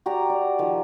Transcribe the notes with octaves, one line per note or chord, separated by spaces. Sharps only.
F#4 G4 D5 A#5
D5
D#3 F3